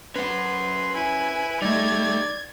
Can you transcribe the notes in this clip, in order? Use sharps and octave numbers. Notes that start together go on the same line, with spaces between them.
C#4 B4 F#5 C6
E4 G#5
G3 A3 D#4 D5 G#6